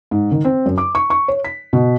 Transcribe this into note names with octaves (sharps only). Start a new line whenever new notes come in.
G#2
D#3
C4
F#2
D6
C#6
C#6
C#5
B6
B2